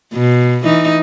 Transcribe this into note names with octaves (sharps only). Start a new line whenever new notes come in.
B2
E3 D#4